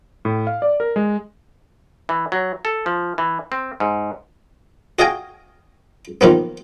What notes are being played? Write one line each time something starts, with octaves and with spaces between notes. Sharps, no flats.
A2
F5
D5
A#4
G#3
E3
F#3
A4
F3
E3
C4
G#2
F#4 D#5 F5 G5 G#5
D#3 F3 A#3 B3